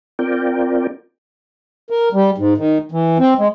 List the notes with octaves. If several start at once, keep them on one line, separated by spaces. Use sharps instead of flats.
C4 F4 A#4 D5 G5
A#4
G3
G#2
D#3
E3
C4
G#3